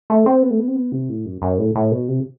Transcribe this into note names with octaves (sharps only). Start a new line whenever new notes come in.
A3
C4
B3
A3
B3
C4
B3
C3
A2
F#2
F#2
A2
A2
B2
C3